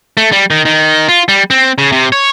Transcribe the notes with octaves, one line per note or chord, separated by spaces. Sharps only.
A3
G3
D#3
D#3
F4
G3
C4
C#3
C3
C#5